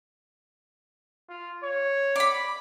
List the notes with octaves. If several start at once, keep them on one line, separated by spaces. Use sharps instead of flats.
F4
C#5
D5 B5